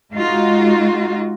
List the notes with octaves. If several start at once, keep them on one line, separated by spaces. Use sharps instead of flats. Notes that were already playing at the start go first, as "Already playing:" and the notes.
G#3 D#4 F4 F#4